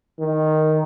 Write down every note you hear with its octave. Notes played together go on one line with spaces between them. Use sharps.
D#3